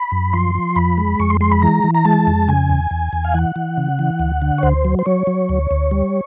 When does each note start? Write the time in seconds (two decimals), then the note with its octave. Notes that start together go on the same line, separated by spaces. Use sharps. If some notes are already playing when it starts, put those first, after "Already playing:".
Already playing: B5
0.12 F#2
0.33 F3 C6
0.55 F3
0.76 F2 B5
0.98 G#3
1.19 F2 C#6
1.30 C6
1.41 G#3 C6
1.52 B5
1.62 E3 A#5
1.84 E3
1.94 A#5
2.05 G#3 A5
2.27 F2
2.48 C#3 G#5
2.70 E2
2.91 E2
3.13 E2
3.25 F5
3.34 E3 F#5
3.56 E3
3.78 C#3
3.99 E3
4.19 D2
4.42 D3
4.58 C#5
4.63 D2 C5
4.85 F#3
4.99 C5
5.06 F#3 C#5
5.27 F#3
5.49 D2
5.71 D2
5.91 G3